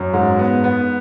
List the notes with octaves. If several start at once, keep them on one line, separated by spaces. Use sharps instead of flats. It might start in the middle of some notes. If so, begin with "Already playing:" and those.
Already playing: F#2
G#2
B3
B3